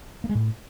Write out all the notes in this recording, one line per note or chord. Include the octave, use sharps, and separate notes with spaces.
A#3
G#3
A2